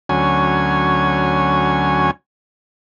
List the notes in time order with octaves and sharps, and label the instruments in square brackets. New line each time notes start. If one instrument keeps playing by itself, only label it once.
[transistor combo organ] D2 F#3 C#4 G#5